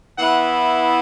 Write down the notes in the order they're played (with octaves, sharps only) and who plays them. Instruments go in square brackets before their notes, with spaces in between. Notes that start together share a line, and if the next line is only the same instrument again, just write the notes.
[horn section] E3 B3 E4 F#5